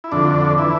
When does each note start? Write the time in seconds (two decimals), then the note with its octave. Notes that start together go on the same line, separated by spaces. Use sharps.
0.04 E4
0.12 F2 D3 D4
0.58 E3 E4